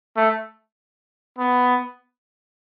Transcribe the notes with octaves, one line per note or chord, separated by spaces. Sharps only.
A3
B3